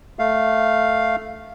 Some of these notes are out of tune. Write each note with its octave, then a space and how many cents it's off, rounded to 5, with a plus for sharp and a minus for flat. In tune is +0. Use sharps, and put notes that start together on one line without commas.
A3 +0 F5 +0